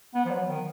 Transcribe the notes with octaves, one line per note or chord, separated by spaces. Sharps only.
B3
F3
F#3
D#3